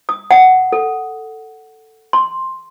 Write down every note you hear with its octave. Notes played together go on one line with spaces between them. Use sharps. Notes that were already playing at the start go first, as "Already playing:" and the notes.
D#6
F#5
A4
C6